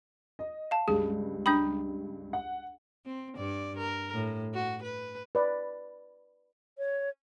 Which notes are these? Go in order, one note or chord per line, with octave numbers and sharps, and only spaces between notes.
D#5
F5 A5
C#2 G2 G#4
D4 G5 B5 D#6 G6
F#5
C4
G2 D5
A#4
A2
F#4
B4
B4 D5
C#5